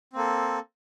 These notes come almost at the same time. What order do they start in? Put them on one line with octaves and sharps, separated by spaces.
C4 A#3 A4